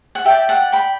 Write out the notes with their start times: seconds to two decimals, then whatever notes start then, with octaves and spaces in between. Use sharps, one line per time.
0.15 F#5
0.25 G4 D5 E5 G5
0.49 F#5 A5
0.72 G5 B5